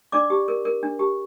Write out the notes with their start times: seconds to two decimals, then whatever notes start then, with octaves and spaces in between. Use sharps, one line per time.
0.12 D4 D5 D6
0.30 G4
0.48 A#4
0.65 A#4
0.83 D4
0.99 G4